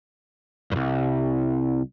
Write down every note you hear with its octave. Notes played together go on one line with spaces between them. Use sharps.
C2 G2